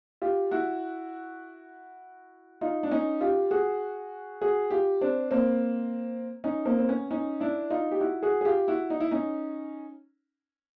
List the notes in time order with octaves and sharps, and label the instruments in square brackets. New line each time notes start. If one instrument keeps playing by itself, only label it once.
[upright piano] F4 G4
E4 F#4
D#4 F4
D4
C#4 D#4
F4 G4
F#4 G#4
F#4 G#4
F4 G4
C4 D4
A#3 C4
C#4 D#4
A#3 C4
C4
B3 C#4
C#4 D#4
D4 E4
D#4 F4
G4
E4 F#4
F#4 G#4
G#4
F4 G4
E4 F#4
D#4
E4
C#4 D#4